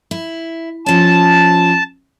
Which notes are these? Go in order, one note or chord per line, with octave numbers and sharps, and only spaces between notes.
E4
F3 C#4 A5